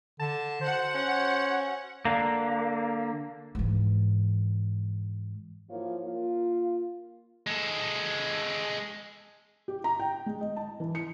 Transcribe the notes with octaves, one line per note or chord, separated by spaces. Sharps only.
D3 A5
F#4 C5 F#5
C#4
D3 A#3
G#2 E3
F3 F#3 A#3 E4 F4 C#5
A#3 F4
G#3 A4
G4
A#5
G5
G#3
D#5
A5
E3
C#7